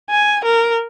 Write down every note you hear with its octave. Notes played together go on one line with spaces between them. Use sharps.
G#5
A#4